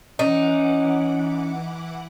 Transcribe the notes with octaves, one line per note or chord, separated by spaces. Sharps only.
E3 C#4 D#4 F#5 D6